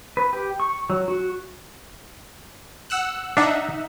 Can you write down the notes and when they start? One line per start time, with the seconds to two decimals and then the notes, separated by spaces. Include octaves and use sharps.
0.17 B4
0.33 G4
0.60 C#6
0.90 F#3
1.08 F#4
2.90 F#5 E6 F#6
3.37 D4 D#4 E5 F#5